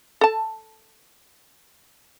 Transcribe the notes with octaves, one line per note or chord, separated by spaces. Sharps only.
A4 A5